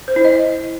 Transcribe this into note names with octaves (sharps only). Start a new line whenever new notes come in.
C5
E4
D#5